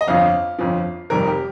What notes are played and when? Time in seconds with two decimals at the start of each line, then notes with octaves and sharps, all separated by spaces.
0.01 D#5
0.07 G1 F2 F3 F5
0.59 G1 F2 F3
1.10 F1 F2 D#3 G3 A#4
1.27 G4